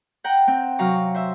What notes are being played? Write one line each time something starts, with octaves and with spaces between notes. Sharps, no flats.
F#5 G5 A#5
C4
C3 F#3 F5 A#5 C#6
C5 E5